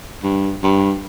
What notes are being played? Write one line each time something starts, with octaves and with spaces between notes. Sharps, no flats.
G2
G2